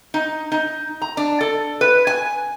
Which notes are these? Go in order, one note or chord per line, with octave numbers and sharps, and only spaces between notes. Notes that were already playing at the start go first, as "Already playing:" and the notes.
D#4
D#4
A#5
D4
A4
B4
G#5